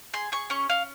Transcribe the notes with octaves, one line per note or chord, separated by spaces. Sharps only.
G#4 C6
G#4 C#6
C#4 C#6
C#4 F5